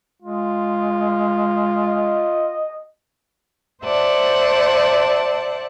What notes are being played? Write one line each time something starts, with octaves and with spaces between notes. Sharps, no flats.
G#3 F4
D#5
C5 D5 E5 F#5 A5